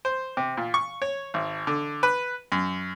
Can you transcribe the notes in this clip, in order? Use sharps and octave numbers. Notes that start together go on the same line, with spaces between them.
C5
C3
A#2
C#6
C#5
G#1
D3
B4
F#2